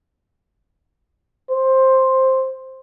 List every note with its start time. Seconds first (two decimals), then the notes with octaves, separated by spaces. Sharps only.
1.50 C5